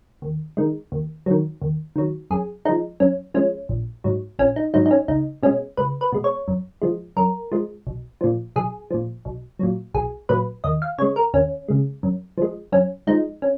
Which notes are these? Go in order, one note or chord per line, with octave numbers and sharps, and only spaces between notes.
D#2
D#3 G#3
D#2
D#3 F#3
D#2
D#3 F#3
F#2 G#4
F3 G#3 D#4
F#2 C#4
F3 G#3 C#4
A#1
G#2 F#3
A#1 C#4
D#4
G#2 F#3 D#4
D#4
C#4
C#2 D#4
B2 G#3 C#4
C#2 B4
B4
B2 G#3
C#5
F#2
F3 G#3
F#2 A#4
F3 G#3
B1
A#2 F3
B1 G#4
A#2 F3
B1
A#2 F#3
B1 G#4
A#2 F#3 B4
D#2 D#5
F5
C#3 G#3 C#5
A#4
D#2 C#4
C#3 G#3
F#2
F3 G#3
F#2 C#4
F3 G#3 D#4
C#4